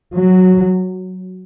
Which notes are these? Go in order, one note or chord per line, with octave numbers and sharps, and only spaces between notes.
F#3